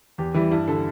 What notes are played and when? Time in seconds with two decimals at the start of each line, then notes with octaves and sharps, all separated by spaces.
0.18 E2 G4
0.34 E3 G3 E4
0.51 G2 E4
0.68 D3 G3 A4